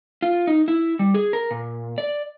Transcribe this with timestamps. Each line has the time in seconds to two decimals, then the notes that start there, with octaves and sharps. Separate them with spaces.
0.22 F4
0.47 D#4
0.68 E4
0.99 G3
1.14 G#4
1.33 A#4
1.51 A#2
1.98 D5